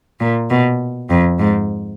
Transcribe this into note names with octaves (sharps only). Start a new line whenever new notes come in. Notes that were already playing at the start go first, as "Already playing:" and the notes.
A#2
B2
F2
G#2